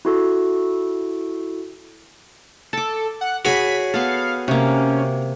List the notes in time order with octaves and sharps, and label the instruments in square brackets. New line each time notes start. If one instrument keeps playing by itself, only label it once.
[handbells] E4 F#4 A4
[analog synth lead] A4 [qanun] A5 D6
[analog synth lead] F#5
[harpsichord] F#4 G#4 G#5 [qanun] C#5 B5 [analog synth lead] B6
[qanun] B3 A4 [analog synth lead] F5
[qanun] C3 A#3 [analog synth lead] C#4